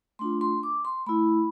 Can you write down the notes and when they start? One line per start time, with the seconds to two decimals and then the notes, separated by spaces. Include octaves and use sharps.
0.19 A3 D4 F4 C6
0.41 C6
0.63 D6
0.85 C6
1.06 A3 E4 B5